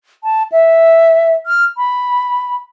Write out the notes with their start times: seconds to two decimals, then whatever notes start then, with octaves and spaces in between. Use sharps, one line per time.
0.24 A5
0.52 E5
1.46 F6
1.77 B5